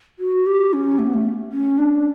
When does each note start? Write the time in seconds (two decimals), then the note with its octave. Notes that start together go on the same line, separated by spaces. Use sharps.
0.19 F#4
0.46 G4
0.73 C#4
0.99 A3
1.06 B3
1.14 A3
1.52 C#4
1.78 D4